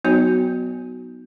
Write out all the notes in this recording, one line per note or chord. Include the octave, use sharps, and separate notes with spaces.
F#3 B3 D#4 F#4 C#5 G#5